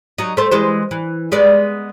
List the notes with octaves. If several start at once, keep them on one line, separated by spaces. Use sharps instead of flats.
F#3 D#4
A3 C5
E3 G#3 C5
E3
G#3 B3 D5